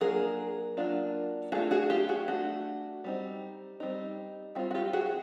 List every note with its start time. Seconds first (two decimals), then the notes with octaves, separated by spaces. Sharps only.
0.01 F#3 A#3 D4 F4 G#4 A#4
0.77 F#3 A#3 D4 F4
1.52 A3 D4 F4 F#4 G#4
1.71 F#4 G#4
1.90 F4 G4
2.09 F#4 G#4
2.28 A3 D4 F4 F#4
3.04 G3 C4 D#4
3.80 G3 C4 D#4
4.55 G3 C4 F4 F#4
4.71 F#4
4.74 F4 G4
4.93 F#4 G#4